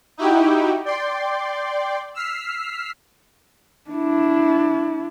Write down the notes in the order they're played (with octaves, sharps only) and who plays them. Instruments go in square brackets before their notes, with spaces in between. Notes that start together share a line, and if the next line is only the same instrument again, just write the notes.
[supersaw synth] D#4 E4 F#4 G4 G5
D5 G5 C6
E6 F6 B6 C7
[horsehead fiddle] D4 E4